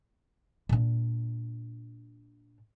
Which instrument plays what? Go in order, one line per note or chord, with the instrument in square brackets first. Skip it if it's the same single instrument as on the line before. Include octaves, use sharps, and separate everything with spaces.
[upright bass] A#2 D4